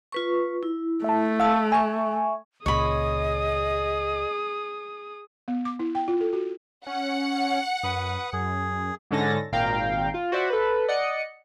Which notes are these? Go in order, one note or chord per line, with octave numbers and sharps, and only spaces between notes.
F4 B4 C#6
E4
A3 E5 A5
F5 A5 E6
E5 G#5 C#6
C#2 A#2 G#4 C#5 D#5 B5 D#6
B3
D6
E4
G5
F4
A4
F#4
C#4 F#5
F#2 B4 D#6
F#2 G#4
G#2 D3 C#4 A4 A6 A#6
G#1 A#2 F5 G5 A#5
F4
F#4 C5 D5 E5 F#5
A4 B4
D5 D#5 F#5 C#7